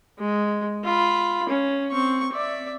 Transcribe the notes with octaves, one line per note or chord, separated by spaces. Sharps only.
G#3
F4 B5
C#4
C4 C#6
D5 E5